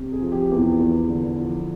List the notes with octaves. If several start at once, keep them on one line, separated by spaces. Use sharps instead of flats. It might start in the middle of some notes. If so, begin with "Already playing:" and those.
Already playing: C3
G#4
F3
G4
E2 E4
E2
D3
F3